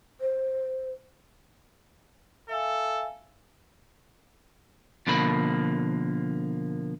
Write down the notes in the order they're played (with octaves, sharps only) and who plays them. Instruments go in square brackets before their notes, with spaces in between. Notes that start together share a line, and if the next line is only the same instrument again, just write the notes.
[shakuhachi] C5
[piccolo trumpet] A4 [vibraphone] E5 F5 G#5
[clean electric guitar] B2 D3 F3 A#3 B5